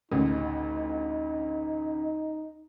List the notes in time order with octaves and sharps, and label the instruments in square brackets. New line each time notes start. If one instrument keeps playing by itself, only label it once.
[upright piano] A1 D2 C#3 [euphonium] D#4